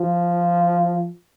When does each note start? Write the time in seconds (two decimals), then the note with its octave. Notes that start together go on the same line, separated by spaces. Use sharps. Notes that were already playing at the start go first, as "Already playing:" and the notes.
Already playing: F3